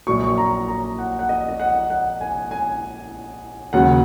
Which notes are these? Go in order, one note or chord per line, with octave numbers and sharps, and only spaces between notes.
A#1 A#2 F#3 C#6
C#6
A#5
A#5
F#5
F#5
D#5
D#5
F#5
F#5
G#5
G#5
D#2 C#3 F#3 F#5